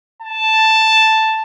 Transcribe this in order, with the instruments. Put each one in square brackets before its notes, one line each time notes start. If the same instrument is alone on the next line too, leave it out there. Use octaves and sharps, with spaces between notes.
[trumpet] A5